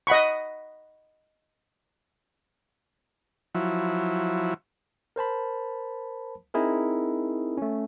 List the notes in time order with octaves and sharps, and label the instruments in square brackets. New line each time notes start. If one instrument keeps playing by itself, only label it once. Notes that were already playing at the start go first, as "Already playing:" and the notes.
[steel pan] D#5 F#5 B5 C#6
[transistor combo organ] F3 F#3 E4
[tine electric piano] A#4 C5 A5 B5
C4 D#4 E4 G#4 A#4
A3 C#4